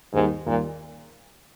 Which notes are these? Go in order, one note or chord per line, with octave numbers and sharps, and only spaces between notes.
D#2 G#2 D#3 G3
D#2 A#2 D#3 G3